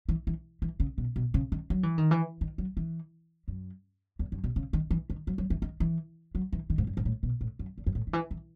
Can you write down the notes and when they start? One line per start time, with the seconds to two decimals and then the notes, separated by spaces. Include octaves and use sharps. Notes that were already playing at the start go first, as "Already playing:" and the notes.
0.09 E3
0.27 E3
0.62 E3
0.80 C#3
0.98 B2
1.16 B2
1.34 C#3
1.52 D#3
1.70 F#3
1.83 E3
1.98 D#3
2.11 E3
2.41 D#3
2.58 F#3
2.77 E3
3.48 F#2
4.19 E2
4.32 F#2
4.44 B2
4.56 C#3
4.73 D#3
4.91 E3
5.10 D#3
5.27 F#3
5.38 F#3
5.50 E3
5.62 D#3
5.80 E3
6.35 F#3
6.53 E3
6.70 D#3
6.78 G#2
6.87 F#2
6.97 G#2
7.05 A2
7.23 B2
7.41 A2
7.59 F#2
7.78 E2
7.87 F#2
7.95 A2
8.07 D#3
8.13 E3
8.31 E3